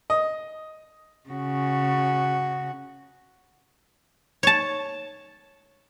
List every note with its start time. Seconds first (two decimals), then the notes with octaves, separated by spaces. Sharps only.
0.10 D#5
1.29 C#3 F#4
4.43 C#5 A5